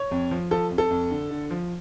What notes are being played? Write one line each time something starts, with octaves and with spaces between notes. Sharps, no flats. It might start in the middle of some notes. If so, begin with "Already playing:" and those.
Already playing: C#5
F2
F3
F3 A4
F2
A4
F2
D3
D3
F3